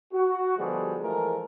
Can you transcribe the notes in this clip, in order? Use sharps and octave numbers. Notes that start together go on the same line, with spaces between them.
F#4
B2 D3 F3 G3 G#3
E3 F3 G#3 A3 A#4